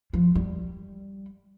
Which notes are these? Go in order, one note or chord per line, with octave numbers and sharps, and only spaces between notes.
F3
G3